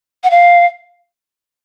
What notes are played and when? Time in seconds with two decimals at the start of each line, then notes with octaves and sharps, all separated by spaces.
0.24 F#5
0.31 F5